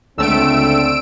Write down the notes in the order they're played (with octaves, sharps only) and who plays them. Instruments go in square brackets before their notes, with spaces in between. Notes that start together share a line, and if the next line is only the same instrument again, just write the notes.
[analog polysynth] C#2 A3 [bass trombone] D3 [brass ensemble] C4 [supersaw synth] E6 D7